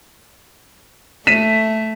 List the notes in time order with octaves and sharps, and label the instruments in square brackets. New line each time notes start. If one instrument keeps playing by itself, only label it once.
[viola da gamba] A3 [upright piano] B6 D#7 E7